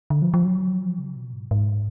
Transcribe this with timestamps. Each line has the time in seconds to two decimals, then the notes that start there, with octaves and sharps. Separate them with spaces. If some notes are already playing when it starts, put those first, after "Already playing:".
0.10 D3
0.22 F3
0.34 F3
0.45 F#3
0.80 F3
0.99 C#3
1.16 B2
1.33 G#2
1.51 G#2